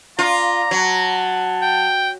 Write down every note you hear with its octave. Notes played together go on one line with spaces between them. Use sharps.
F4 D5 F5 A#5 C6
F#3 F#5 A5
G5